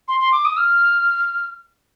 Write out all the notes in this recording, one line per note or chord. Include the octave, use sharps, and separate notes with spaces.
C6
C6
D6
D#6
F6